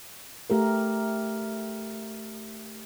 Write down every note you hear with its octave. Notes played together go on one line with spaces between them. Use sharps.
A3 G4 A#4